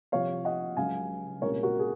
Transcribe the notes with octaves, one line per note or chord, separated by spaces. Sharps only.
C2 C3 F3 C#5 F5
D#5 F#5
C#2 C#3 F#3 C#4 F5 G#5
C2 A#2 G#3 C#4 A#4 C#5
F#4 A#4
G#4